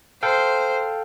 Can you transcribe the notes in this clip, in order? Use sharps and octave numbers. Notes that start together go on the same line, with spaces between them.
A4 C5 F5 G5